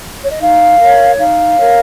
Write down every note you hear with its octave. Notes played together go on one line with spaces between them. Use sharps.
C#5
D#5
D#4 F5
A#4 C#5
D#4 F5
A#4 C#5